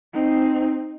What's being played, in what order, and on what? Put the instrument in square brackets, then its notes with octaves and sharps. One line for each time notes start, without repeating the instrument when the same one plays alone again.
[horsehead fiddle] C4 D#4